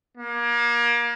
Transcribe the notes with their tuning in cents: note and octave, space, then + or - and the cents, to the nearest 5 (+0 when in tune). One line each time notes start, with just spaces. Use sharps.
A#3 +30